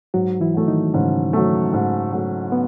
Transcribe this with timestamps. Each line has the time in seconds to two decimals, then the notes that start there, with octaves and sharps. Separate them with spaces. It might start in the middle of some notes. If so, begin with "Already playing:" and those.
0.14 G#2 F#3 F#4
0.41 E3 E4
0.54 F#3 A3
0.67 D#3 D#4
0.94 G#2 C#3 C#4
1.33 F#3 A3
1.73 G#2
2.12 F#3 A3
2.52 B3